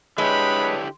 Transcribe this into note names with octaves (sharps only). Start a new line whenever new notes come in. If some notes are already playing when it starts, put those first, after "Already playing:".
D3 G#3 D4 E4 G4 B4 C#5 B5